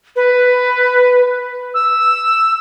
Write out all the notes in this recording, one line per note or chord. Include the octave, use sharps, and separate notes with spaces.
B4
E6